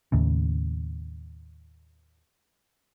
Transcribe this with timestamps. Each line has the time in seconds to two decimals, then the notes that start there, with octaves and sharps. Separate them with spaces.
0.12 D#2 A2 C#3